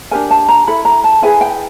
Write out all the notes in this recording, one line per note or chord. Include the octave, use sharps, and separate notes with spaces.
D4 G4 A#4 G#5
A5
A#5
E4 A4 B5
A#5
A5
E4 G#4 B4 G#5
G5